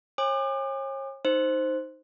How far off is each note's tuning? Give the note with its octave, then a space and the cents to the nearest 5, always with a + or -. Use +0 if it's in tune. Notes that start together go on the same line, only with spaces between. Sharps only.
C#5 -40 G#5 -40 D6 +40
D#4 +0 C5 +0